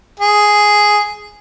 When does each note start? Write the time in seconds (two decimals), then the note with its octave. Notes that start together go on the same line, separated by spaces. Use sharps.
0.20 G#4